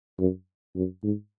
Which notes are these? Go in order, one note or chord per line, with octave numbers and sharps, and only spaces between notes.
F#2
F#2
G#2